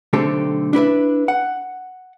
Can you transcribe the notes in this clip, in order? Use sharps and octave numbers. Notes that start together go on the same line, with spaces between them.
B1 D3 A3 C4 G4 A4
D4 E4 B4 E5
F#5